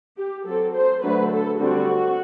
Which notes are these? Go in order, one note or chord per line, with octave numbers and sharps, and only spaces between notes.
G4
F#3 C4 A4
C5
D3 F#3 A3 B4
A4
D3 G3 C4 F#4